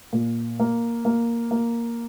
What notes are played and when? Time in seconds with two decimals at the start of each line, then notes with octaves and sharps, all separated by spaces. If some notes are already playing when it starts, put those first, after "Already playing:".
0.13 A#2
0.60 A#3
1.05 A#3
1.51 A#3